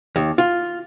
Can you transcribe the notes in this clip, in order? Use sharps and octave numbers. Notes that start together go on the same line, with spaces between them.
D#2
F4